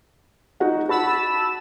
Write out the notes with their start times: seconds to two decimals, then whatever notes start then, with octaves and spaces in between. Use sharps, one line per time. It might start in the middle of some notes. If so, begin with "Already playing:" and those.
0.60 D#4 F#4 F#5
0.89 F#4 A5 B5 E6